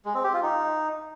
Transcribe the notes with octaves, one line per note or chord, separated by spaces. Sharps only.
G#3
C4
G4
F4
D#4